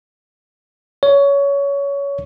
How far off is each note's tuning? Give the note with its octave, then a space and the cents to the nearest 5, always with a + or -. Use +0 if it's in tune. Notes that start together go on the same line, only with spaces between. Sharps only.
C#5 +20